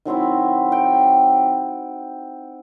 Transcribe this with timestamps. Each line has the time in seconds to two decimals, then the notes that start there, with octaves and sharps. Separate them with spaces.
0.05 D#3 F#3 C4 E4
0.72 G5